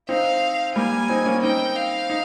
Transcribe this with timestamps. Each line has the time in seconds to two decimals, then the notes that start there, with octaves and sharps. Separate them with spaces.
0.09 C4 D#4 F5
0.76 G3 A#3 G#5
1.09 C4 D#4
1.26 A#3 C#4
1.43 C4 D#4 G5
1.76 F5
2.10 D#4